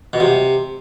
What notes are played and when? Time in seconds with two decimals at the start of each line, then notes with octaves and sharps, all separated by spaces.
0.13 B2
0.20 C3